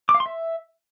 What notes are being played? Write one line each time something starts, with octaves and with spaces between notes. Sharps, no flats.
D6
F5
C6
E5